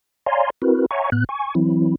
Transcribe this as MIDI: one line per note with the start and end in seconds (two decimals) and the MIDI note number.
0.26 0.50 73
0.26 0.50 74
0.26 0.50 77
0.26 0.50 80
0.26 0.50 82
0.26 0.50 84
0.62 0.86 60
0.62 0.86 64
0.62 0.86 66
0.62 0.86 70
0.62 0.86 71
0.91 1.10 73
0.91 1.10 76
0.91 1.10 78
0.91 1.10 80
0.91 1.10 82
0.91 1.10 85
1.12 1.24 45
1.12 1.24 59
1.12 1.24 90
1.29 1.54 80
1.29 1.54 85
1.55 1.95 52
1.55 1.95 54
1.55 1.95 60
1.55 1.95 64